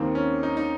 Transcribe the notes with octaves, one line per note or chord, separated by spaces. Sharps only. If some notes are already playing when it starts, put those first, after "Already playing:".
Already playing: D#2 D#3 A#3 C4
C#4
D#4
D#4